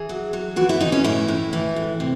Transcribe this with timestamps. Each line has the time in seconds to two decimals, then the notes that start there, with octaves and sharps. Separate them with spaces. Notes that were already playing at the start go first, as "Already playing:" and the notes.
Already playing: E3 G#4
0.09 F#3
0.33 F#3
0.56 E3 F#4
0.69 E4
0.81 E3 D#4
0.92 C#4
1.04 A2 E4
1.28 A2
1.53 E3
1.76 A2
2.00 C3